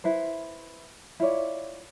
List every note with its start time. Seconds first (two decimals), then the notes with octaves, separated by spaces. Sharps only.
0.04 E4 B4 C5
1.20 E4 F4 C#5 D5